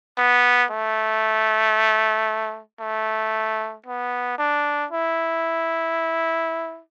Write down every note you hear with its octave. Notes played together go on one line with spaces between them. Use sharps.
B3
A3
A3
B3
D4
E4